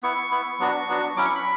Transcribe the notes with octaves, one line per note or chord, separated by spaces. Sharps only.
B3 E4 C#6
B3 E4
F#3 B3 D4 F#4
F#3 B3 D4 F#4
F#3 C#4 E4 D6
C#6
B5